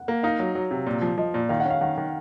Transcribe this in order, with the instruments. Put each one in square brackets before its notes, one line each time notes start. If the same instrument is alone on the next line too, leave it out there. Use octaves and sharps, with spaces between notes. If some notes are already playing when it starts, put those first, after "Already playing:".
Already playing: [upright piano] F#5
[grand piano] A#3
[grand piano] D#4 [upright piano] F5
[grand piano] F#3
F#3
C3
A#2
F3
[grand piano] F3 [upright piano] D#5
[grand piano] A#2
[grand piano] D#3 [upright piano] F5
[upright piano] F#5
[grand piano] C#4
[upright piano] F5
[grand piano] D#3 [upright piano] F#5
[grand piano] D#3